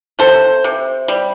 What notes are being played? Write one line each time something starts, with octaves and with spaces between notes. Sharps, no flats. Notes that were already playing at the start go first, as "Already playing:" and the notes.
C3 A4 C5
C3
G3